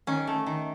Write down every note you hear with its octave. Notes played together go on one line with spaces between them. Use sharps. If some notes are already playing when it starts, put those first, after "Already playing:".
D#3 C#4
A3
D#3